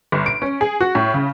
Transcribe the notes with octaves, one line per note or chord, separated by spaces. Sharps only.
G1
D7
C#4
G#4
F#4
A2
C#3